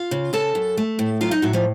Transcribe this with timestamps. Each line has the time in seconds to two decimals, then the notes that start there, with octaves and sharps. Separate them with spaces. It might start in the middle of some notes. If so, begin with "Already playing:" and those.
Already playing: F4 F5
0.11 C#3
0.33 C#3 A4 A5
0.55 F#2
0.77 A3
0.99 A2
1.21 F#3 F4 F5
1.31 D#4 D#5
1.42 A2 F#3 F#4
1.53 F3 F4